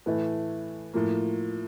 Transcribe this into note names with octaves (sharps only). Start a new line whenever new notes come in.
A2 E3 A3 B4
A2 F3 A#3